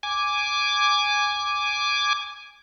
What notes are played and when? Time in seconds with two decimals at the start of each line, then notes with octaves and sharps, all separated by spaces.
0.03 G#5 D6